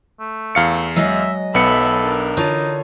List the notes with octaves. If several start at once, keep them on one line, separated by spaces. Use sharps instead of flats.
A3
E2 F5 C#7
F#3 G#3 D#5 E5
B1 B3 A4 E5 B5 C#7
D4 A#4
D3 D#4 F4 C#5